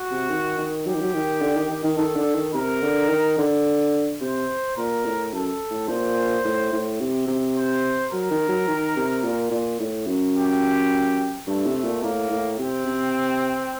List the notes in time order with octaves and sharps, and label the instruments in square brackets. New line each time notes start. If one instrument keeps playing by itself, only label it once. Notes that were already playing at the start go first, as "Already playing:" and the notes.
Already playing: [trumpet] F#4
[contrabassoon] C3
D#3
D#3
[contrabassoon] F#3 [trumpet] G4
[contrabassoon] D#3
F#3
D#3
D3
D#3
D#3
D#3
[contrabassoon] D#3 [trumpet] A4
[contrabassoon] D3
D#3
[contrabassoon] C3 [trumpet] A#4
[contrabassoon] D3
D#3
D3
[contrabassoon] C3 [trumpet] C5
[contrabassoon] A#2 [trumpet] A#4
[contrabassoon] A2
[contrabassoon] F#2 [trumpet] A4
[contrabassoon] A2
[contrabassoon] A#2 [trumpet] C5
[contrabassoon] A2
A2
C3
C3
[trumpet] C5
[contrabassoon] F#3 [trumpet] A#4
[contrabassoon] D#3
F#3
D#3
C3
A#2
A#2
A2
F#2
[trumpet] G4
[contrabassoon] G2 [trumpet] A3
[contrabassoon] C3
A#2
[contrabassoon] A2 [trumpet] A#3
[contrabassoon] A2
[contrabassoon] C3 [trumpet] C4
[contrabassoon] C3